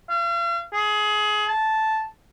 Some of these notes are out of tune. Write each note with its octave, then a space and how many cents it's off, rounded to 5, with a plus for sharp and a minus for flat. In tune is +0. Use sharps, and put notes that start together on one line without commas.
F5 -40
G#4 +25
A5 -5